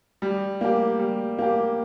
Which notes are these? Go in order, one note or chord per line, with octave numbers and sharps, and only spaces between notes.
G3
A#3 G4
G3
A#3 G4